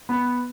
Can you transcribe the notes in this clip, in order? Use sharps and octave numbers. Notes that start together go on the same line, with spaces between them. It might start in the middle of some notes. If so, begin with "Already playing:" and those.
B3